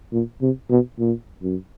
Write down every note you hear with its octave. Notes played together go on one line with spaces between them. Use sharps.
A#2
C3
B2
A#2
F#2